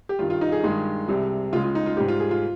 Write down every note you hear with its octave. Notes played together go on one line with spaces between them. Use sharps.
G4
G2 D#3 G3 F4
F4
D#4
G#4
G2 D#3 G#3
C2 C3 G3
C#2 C#3 G#3 F4
F4
D#4
F4
G#2 G3 G4
F4
G#4
F4